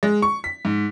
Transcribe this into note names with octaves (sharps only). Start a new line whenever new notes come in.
G#3
C#6
B6
G#2